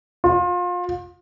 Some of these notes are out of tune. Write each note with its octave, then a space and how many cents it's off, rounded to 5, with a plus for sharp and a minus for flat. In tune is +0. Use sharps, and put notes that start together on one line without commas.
F4 +30